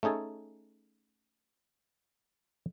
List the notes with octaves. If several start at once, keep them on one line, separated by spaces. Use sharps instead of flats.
A3 C#4 D#4 G#4 A4